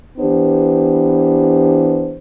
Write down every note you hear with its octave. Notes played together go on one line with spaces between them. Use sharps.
E3 B3 D4 G4 C5